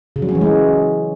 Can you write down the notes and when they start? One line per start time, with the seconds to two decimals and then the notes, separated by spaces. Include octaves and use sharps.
0.16 C#3
0.22 F#3
0.29 C#4
0.35 E3
0.41 G#3